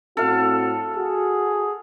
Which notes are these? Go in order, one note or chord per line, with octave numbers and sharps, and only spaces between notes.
A2 C4 F#4 A4 F5
F#4 G#4